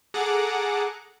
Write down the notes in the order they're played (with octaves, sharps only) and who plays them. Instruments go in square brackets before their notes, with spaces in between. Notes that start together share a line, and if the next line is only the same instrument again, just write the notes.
[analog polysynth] G#4 A4 F#5 A#5 D6